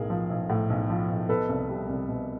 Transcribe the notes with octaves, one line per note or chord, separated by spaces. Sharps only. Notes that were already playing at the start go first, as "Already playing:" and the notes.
Already playing: B1 A2 G#4 A#4
F3
B1
A2
B1
F3
B1
B2 A4 B4
C2
G3
C2
B2